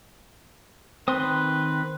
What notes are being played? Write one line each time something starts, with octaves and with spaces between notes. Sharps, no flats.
D#3 C4 B4 C6 D#6